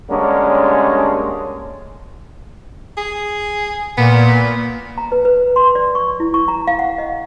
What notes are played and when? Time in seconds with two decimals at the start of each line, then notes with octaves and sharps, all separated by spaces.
0.11 D3 G3 G#3 A#3 C#4
2.97 G#4
3.97 A#2 B3
4.98 A#5
5.12 B4
5.25 B4
5.56 C6
5.75 D5
5.95 C#6
6.20 E4
6.34 C#6
6.48 A#5
6.67 F5
6.79 F#5
6.98 D#5